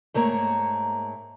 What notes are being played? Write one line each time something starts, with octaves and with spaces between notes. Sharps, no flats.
G#2 A3 A#3 C#5 A#5